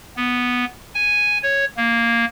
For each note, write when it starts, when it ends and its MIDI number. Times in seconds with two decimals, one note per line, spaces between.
0.16 0.65 59
0.94 1.38 80
1.43 1.65 73
1.77 2.25 58